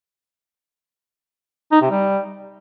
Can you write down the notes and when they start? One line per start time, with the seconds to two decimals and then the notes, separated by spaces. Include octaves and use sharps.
1.72 D#4
1.81 C3
1.91 G3